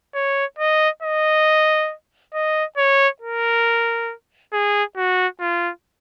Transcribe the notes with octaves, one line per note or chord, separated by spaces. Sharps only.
C#5
D#5
D#5
D#5
C#5
A#4
G#4
F#4
F4